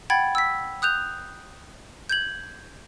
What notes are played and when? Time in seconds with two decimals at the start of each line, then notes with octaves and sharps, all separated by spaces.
0.10 F#5 G5 B5 G#6 A6
0.35 E6 B6
0.82 D#6 F#6 G6 F7
2.09 G6 G#6 F#7